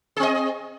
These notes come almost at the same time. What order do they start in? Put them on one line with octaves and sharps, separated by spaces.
G#4 C4 D#5